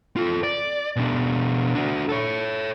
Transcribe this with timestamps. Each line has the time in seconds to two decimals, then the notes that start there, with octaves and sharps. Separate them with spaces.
0.17 F4 A4
0.43 D5
0.96 B2 D4
1.75 D4 F#4
2.09 A4 C#5